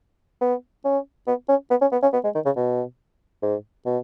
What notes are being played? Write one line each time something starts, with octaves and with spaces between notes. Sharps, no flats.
B3
C#4
B3
C#4
B3
C#4
B3
C#4
B3
G#3
D#3
C#3
B2
G#2
B2